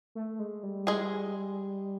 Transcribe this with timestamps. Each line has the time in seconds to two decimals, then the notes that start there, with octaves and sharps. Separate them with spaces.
0.15 A3
0.39 G#3
0.63 G3
0.87 G#3 G#4